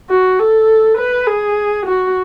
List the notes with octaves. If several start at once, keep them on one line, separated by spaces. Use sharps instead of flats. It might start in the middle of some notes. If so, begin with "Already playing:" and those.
F#4
A4
B4
G#4
F#4